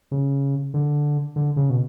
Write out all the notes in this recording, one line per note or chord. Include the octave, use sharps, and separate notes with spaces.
C#3
D3
D3
C#3
B2